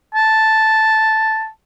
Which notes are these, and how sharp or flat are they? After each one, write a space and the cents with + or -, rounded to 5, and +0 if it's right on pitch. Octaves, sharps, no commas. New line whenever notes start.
A5 +0